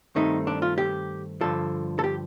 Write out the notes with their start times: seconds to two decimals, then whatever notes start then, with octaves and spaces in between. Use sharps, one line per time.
0.15 G2 D#3 A3 C4 D#4
0.47 D4
0.62 F4
0.78 G4
1.41 G2 D3 F3 A4
1.99 A4
2.04 G4